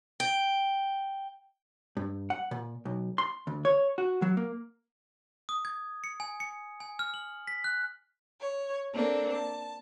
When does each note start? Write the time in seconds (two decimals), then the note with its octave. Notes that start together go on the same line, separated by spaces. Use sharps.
0.20 G5
1.97 G2
2.30 F#5
2.51 A#2
2.85 B1
3.18 C6
3.47 D2
3.65 C#5
3.98 F#4
4.22 F#3
4.37 A#3
5.49 D#6
5.65 G#6
6.04 C#7
6.20 G#5
6.40 C#7
6.80 G#5
6.99 F6
7.14 F#7
7.47 B6
7.64 F#6
8.41 C#5
8.93 A#3 C4 D4 A4
9.33 A5